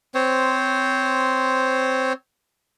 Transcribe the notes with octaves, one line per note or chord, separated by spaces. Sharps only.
C4 C5 C#5